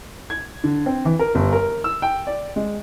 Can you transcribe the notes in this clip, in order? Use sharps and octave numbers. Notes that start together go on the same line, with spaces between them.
G#6
D3
C4
E3
A#4
G1
A#4
E6
G5
D5
G#3